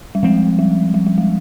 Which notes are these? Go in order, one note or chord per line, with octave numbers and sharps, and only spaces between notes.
G3
F3 G#3 C4
G3
G3
G3
G#3